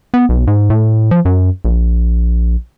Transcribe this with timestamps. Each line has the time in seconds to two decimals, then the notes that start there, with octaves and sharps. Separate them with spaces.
0.14 B3
0.29 B1
0.47 G#2
0.70 A2
1.11 F3
1.25 F#2
1.65 A#1